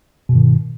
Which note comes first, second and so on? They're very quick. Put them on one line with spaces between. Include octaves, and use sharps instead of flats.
B2 G2 D#3